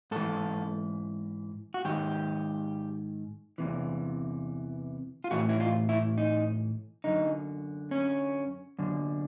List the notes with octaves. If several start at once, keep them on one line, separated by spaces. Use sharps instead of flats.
G#2 E3 A4
F#4
G#2 D#3 G4
E2 C3 E3
F4
A2 E3 F#4
E4
F4
E4
D#4
F#2 D3 D#4
C#4
F#2 D3